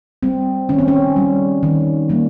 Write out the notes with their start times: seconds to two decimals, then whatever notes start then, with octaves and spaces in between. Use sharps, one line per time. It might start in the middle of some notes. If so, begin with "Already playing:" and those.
0.23 G3 C4
0.69 D#3 C#4
0.79 C4
0.88 C#4
1.16 G3 C4
1.63 D#3
2.09 G3 A#3